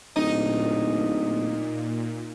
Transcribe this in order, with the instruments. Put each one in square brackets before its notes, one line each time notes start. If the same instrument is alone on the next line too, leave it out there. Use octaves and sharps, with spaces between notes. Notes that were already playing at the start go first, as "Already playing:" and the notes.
[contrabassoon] D1 [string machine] A#2 [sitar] D#4